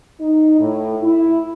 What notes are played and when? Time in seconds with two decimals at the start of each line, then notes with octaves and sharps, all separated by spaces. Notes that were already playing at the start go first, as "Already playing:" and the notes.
0.20 D#4
0.59 A2
1.03 E4